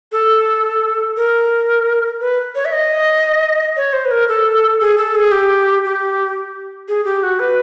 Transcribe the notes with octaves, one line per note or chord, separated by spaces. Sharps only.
A4
A#4
B4
C#5
E5
D#5
C#5
C5
B4
A#4
A4
G#4
A4
G#4
G4
G4
G#4
G4
F#4
B4